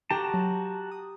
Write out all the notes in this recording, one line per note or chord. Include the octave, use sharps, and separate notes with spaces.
F#4 G4 A5 A#5
F#3
D#6